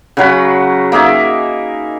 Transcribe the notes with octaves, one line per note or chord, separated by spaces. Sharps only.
C#3 F#3 F#5 B5
A#3 D#4 G#4 E5